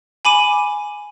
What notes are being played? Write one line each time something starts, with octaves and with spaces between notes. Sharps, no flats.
G#5 B5 D6 D#7